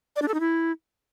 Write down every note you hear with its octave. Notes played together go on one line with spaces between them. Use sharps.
D5
D4
A4
D#4
E4